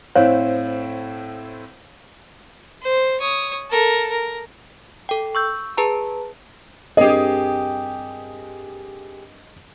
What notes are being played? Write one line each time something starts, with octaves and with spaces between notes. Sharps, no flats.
A2 C4 E4 C5 C#5 F5
C5
C#5 D#6
A4 A#4
A#4
A4 G5
C#6 E6 G6
G#4 B4 A5 A#5
G2 C4 G4 G#4 A#4 D#5